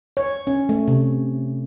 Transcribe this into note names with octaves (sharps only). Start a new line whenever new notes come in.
C#5
C#4
A3
C3